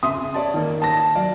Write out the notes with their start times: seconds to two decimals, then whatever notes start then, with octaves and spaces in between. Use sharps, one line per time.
0.03 C#3 E5 C6 D#6
0.34 C#5 D5 A5
0.54 D#3 A#3
0.82 A5 A#6
1.15 F#3 D5 F5